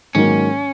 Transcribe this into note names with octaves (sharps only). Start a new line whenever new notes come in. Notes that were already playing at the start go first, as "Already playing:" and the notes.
G#2 D#3 F#3 A#3 C#4 D#4